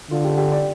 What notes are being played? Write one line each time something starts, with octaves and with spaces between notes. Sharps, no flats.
D3 F4
G4
G4
D5